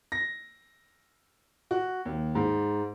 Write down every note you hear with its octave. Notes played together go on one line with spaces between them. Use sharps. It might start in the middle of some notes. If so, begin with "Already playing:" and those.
A#6
F#4
D#2
G#2